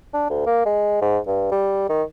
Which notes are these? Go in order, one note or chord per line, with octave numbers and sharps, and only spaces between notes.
D4
D2
A#3
G#3
G#2
G2
G3
D#3